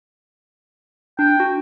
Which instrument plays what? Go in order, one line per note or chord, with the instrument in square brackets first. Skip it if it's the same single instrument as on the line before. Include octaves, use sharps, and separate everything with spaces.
[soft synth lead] D4 [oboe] G5
[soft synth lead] F#4